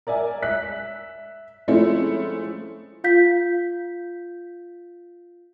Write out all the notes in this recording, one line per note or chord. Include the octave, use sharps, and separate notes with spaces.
A#4 D5 E5 G#5
E5 F#6 B6
F3 G#3 A3 C4 C#4 E4
F4 F5 G6 B6